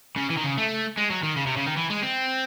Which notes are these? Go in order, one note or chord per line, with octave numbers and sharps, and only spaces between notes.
C#3
E3
D#3
C#3
A3
G#3
F#3
D#3
C#3
C3
C#3
D#3
E3
G#3
C4